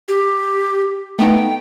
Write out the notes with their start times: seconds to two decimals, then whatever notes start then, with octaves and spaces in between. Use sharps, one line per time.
0.08 G4
1.19 A3 B3 D#4 G5